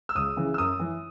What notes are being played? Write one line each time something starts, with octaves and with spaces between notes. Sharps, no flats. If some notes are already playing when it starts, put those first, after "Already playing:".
E6
C#2 D#6
C#3 E3
E6
F#2 D#6
E3